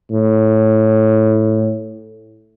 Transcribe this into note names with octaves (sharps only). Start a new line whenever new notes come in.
A2